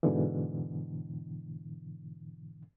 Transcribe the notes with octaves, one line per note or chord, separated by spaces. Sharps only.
G#2 B2 D3 E3